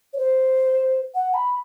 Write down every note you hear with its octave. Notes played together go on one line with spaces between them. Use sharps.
C#5
C5
F#5
B5